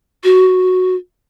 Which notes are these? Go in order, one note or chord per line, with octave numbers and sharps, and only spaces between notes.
F#4